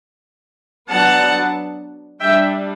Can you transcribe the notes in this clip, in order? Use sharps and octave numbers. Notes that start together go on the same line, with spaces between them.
F#3 B3 D4 F#5 A5
G3 D4 E5 G5